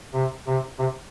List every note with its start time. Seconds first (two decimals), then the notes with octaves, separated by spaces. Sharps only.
0.14 C3
0.47 C3
0.79 C3